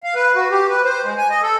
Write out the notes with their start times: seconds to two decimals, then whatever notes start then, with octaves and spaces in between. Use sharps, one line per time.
0.04 F5
0.15 B4
0.35 F#4
0.51 G4
0.69 B4
0.84 C5
1.04 G#3
1.18 G#5
1.30 D#5
1.42 A4